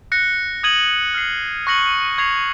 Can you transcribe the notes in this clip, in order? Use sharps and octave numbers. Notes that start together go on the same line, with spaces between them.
F#6 A#6 C#7
D#6 G#6 D#7 F#7
F6 C7 F#7
C#6 F#6 A#6 C#7 F#7
C#6 G#6 C7 F7